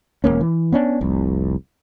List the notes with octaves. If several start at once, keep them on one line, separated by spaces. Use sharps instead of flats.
E1 A2 A#3 C#4
E3
B3 C#4 D4
F1 C2